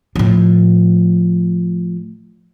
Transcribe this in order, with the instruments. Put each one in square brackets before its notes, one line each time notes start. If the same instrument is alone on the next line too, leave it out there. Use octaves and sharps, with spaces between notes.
[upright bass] A2 F3